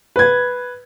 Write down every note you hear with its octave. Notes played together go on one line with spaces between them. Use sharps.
B4 G#6